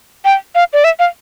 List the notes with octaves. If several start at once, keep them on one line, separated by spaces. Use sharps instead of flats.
G5
F5
D5
E5
F5